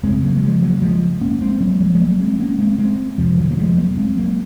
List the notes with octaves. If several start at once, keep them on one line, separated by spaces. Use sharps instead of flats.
F#2 C#3 G#3 C4
F#3 A#3
F#3
F3 G#3
F#3 A#3
F3 G#3
A#3 C#4
G#3 C4
F#3 A#3
F3 G#3
G#3
F#3 A#3
G#3 C4
A#3 C#4
G#3 C4
G#3 C4
F2 C3 F3
D#3 F#3
A#3
F3 G#3
F#3 A#3
A#3
G#3 C4
F#3 A#3